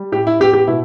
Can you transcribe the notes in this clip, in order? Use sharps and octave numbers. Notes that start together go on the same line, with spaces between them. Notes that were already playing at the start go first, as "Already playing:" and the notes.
Already playing: G3
A2 G4
E4
B3 G4
G4
B2 E4